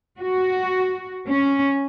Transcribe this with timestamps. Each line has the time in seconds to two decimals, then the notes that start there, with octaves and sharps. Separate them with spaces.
0.19 F#4
1.28 C#4